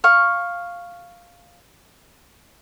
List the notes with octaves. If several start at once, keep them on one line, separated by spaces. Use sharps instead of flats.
F5 C#6